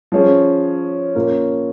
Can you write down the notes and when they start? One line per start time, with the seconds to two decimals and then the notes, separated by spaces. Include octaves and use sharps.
0.12 F3 C#4 G#4
1.15 A#2 A#3 C#4 A#4